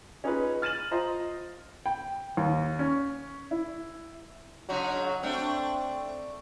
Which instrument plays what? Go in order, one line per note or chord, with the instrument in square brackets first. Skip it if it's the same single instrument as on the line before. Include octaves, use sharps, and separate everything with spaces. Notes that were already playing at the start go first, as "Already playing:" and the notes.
[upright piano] C#4 D#4 F4 G#4 B4
F6 A6 D#7 E7 F#7
F4 C5 D#5 A#5
G5
D#2
C#4
E4
[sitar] C#3 D#4 F#4 [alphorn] F#3
[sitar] A3 D4 [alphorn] C4